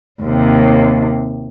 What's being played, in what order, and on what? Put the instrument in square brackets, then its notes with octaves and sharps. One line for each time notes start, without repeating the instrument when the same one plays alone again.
[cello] D#2 C3